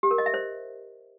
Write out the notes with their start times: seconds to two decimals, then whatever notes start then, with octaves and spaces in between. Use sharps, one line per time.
0.03 G4
0.11 A#4
0.18 D#5
0.26 E5
0.34 C5